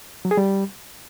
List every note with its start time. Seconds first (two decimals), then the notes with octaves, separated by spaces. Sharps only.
0.25 F#3
0.31 G#4
0.37 G3